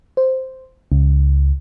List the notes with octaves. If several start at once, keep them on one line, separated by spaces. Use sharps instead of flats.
C5
C#2